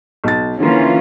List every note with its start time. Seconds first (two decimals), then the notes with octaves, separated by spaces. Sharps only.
0.24 B1 A6
0.60 D3 E3 A#3 C#4 F4